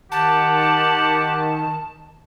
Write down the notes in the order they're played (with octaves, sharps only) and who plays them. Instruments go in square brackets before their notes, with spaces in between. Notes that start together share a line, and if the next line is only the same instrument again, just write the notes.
[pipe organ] D#3 [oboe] G4 [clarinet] F#5 [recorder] A5